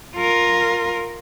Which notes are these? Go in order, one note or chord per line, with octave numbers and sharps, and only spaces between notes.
F4 A#4